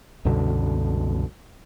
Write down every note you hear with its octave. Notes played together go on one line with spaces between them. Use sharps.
C2 F#2 B2 D3